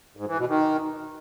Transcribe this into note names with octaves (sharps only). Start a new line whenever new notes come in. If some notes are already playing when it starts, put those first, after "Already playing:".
G#2
E3
B2
D#3